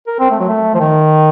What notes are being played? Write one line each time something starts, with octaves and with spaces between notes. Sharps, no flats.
A#4
C4
A3
F#3
A3
F3
D#3